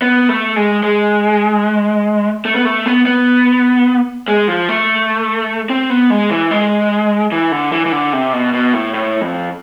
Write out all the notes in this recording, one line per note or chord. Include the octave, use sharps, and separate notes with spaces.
B3
A3
G#3
G#3
A3
B3
A3
B3
B3
G#3
F3
A3
C4
B3
G#3
E3
G#3
E3
D3
E3
E3
D3
C3
B2
B2
A2
A2
F2